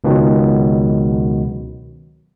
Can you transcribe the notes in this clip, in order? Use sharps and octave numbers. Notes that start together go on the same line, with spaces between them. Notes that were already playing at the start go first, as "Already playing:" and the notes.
C#2 B2 D#3 F#3